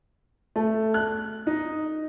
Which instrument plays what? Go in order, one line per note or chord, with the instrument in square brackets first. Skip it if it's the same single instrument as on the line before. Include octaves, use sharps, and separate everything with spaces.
[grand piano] A3
F#6
D#4